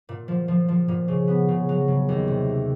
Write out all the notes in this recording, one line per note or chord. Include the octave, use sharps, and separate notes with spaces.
A#2
F3
F3
F3
A#2
C#3
B3
C#3
F#3
C#3
D#2
C3
A3